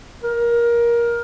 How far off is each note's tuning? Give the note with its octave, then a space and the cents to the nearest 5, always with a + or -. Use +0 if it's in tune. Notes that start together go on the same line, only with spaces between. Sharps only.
A#4 +20